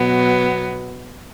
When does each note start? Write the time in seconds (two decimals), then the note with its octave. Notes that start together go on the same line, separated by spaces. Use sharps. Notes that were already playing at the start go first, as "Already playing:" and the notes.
Already playing: B2 F#3 B3